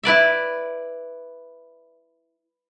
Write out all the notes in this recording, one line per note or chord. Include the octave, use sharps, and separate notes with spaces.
E4 B4 D5 E5